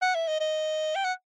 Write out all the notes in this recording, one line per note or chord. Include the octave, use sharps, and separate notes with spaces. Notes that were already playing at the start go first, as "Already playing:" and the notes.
F#5
E5
D#5
D#5
G5
F#5